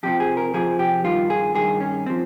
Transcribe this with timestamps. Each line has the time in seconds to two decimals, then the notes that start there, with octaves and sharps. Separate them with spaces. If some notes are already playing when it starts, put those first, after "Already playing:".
0.03 F2 C3 F3 G4
0.20 G#4
0.37 A#4
0.54 F2 C3 F3 G#4
0.79 G4
1.04 G2 D#3 F4
1.30 G#4
1.55 G2 D#3 G#4
1.80 C#4
2.06 F3 C4